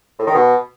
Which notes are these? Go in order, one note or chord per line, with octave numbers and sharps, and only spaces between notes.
A2
D#3
B2